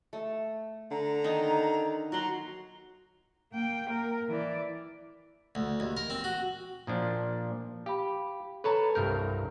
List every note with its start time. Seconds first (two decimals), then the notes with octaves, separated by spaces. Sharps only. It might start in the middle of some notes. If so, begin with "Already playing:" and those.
0.13 A3
0.91 D3 A#5
1.24 D#3 D#4 D#5
2.12 F#3 F#4 F#5 A#5 C6
3.53 A#3 G5
3.90 A#4
4.29 E3 D5
5.55 D2
5.80 D#2
5.97 A#4
6.10 C4
6.24 F#4
6.87 A#2 F3 D4
7.86 G4 F5 B5
8.64 A4 B4 C#5 A5 A#5
8.95 C2 G2 A#4 G6